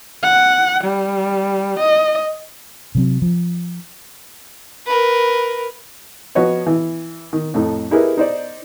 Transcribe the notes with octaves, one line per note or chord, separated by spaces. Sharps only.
F#5
G3
D#5
C3 F#3 C4
F3
A#4 B4
F3 F#4 B4 C#5 D#5
E3
D#3
F2 A2 A3 D#4
D#4 E4 G4 G#4 A#4 B4
D#4 C5 D5